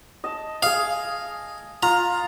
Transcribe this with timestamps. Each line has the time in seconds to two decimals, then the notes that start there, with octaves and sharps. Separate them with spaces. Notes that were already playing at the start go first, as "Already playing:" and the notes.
0.24 D#5 A5
0.63 G#4 F5 D#6
1.83 F4 A#5